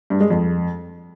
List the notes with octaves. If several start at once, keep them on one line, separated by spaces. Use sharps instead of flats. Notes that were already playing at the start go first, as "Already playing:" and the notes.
G2
G#3
F2